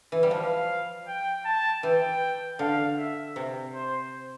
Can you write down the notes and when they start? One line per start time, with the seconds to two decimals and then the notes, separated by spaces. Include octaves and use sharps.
0.12 E3
0.23 G3
0.31 F3 F5
1.08 G5
1.45 A5
1.83 E3 G5
2.59 D3 F5
2.98 E5
3.36 C3
3.74 C5